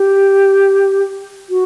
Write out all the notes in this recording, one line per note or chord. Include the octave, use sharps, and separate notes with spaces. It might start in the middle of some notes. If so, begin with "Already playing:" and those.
Already playing: G4
F#4